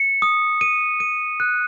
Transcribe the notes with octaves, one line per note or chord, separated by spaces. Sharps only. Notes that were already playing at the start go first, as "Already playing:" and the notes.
Already playing: C#7
D#6
D#7
D#7
F#6